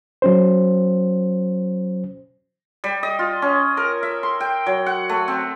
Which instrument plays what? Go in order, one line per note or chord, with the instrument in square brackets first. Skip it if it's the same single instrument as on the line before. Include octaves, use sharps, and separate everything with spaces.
[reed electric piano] F#3 C#4 C5
[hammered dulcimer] G3
D#5
F4
C#4
A#4
E5
C6
G5
F#3
F#5
A3
C4